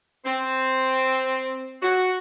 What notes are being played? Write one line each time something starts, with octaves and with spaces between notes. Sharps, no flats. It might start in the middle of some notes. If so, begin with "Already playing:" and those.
C4
F#4